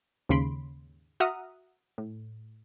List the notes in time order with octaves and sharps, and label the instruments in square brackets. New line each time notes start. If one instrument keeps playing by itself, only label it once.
[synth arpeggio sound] D#2 G#2 C#3 B5 C6 D7
F#4 E5 F#5 A#5 D#6 F6
A2